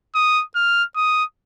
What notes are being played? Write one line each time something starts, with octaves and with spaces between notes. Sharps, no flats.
D#6
F6
D#6